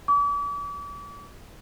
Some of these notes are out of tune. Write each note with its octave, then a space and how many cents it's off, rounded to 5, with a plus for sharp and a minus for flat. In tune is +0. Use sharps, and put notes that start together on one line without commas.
D6 -40